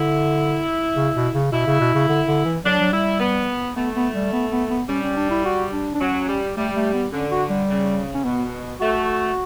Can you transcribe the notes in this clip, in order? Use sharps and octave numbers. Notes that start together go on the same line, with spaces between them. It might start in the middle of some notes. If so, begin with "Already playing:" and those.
Already playing: D3 E4
C#3
B2
C#3
B2 E4
C#3
B2
C#3
D3
D3
E3
F#3 D4
F#3
G3 E4
B3
A3 B3
B3
G3
B3
B3
B3
G3 C#4
C#4
D4
E4
F#4
D4
D4
F#3 C#4
G3
G3 A3
A3
B3
D3 C#4
F#4
G3
C#3
C#4
B2 B3
A3 F#4